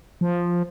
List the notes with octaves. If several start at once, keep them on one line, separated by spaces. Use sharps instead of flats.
F3